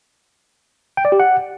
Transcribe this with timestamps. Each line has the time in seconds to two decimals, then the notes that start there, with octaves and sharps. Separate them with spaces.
0.97 G5
1.05 D5
1.12 G4
1.20 F#5